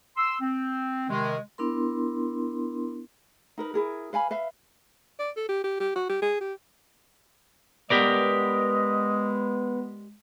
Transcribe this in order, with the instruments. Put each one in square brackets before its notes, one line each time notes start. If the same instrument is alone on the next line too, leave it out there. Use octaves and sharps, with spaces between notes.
[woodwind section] C6 E6
C4
C3 D#3 G#3
[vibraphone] B3 D4 E4 A#4 C6
[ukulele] D#4 A#4 B4
E4 G#4 A#4
B4 F5 G#5 B5
B4 E5 F5
[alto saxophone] D5
A4
G4
G4
G4
F#4
G4
G#4
G4
[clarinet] G#3 [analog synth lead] B3 [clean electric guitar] G4 A#4 D5 [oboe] D#5